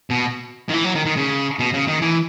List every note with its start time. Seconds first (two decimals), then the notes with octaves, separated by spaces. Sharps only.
0.10 B2
0.69 D#3
0.73 E3
0.84 F#3
0.95 D#3
1.06 D#3
1.17 C#3
1.59 B2
1.74 C#3
1.88 D#3
2.02 E3